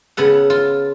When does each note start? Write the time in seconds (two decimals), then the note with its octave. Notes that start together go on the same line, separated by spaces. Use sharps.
0.17 C#3 B3 A4 F#5
0.50 F4